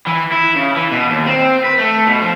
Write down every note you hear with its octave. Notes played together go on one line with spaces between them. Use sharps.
E3
E4
C#3
E3
B2
D#2
C4
B4
A3
B2
F3